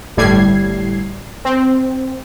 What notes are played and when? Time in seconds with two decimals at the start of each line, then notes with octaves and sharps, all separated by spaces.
0.17 G1 A2 G3 G#6 C7
1.45 C4